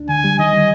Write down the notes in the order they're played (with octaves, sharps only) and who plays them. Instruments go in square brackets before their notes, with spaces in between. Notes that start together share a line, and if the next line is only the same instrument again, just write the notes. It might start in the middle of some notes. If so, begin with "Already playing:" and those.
Already playing: [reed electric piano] D2 D4
[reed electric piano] D3 [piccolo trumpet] G#5
[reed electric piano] G3
[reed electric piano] D#3 [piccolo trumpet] D#5
[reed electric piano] G3